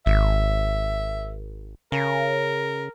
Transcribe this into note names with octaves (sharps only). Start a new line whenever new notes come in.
G#1 E5
C#3 A#4